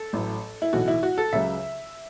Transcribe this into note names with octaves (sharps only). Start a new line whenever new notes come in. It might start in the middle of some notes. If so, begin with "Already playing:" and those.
Already playing: A4
A1 A2 F#3
E4
B1 A2 E3 F#4
E4
F#4
A4
C#2 C#3 F#3 E5